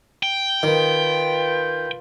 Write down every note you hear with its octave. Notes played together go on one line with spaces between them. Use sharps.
G5
D#3 F4 B4